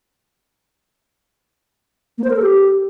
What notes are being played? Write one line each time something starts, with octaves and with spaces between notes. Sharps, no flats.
A#3
C5
A#4
A4
G4